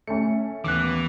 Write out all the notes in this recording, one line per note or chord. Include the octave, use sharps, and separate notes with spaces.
A3 C#4 C#7
D#2 E3 B3 D6 F#6